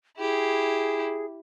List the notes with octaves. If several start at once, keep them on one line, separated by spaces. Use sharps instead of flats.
E4 G4 G#4